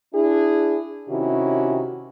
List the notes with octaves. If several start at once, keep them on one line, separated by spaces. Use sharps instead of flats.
D4 E4 G#4
C3 D#3 C#4 E4 F#4 G4